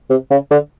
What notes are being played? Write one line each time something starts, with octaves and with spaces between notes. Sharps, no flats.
C3
C#3
D3